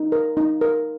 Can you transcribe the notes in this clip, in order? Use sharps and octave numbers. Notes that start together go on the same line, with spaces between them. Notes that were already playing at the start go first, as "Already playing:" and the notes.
Already playing: D#4
A#4
D#4
A#4